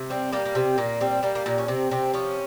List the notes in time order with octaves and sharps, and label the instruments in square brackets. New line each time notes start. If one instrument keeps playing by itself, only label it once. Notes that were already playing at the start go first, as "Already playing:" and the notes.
Already playing: [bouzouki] C3
G3 C4
G3 A#3
A#3
C3 C4
A#2 A#3
G3 C4
G3 A#3
A#3
A#2 A#3
C#4
C3 C4
C3 C4
F3 C#4